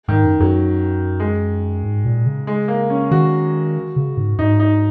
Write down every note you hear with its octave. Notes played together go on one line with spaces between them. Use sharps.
G#2 D#3
F#2
F#2 F#3
G#3
G#2
A#2
C#3
G#3
A#3
C#4
D#3 F#4
C#3
G#2
G#2 D#4
D#4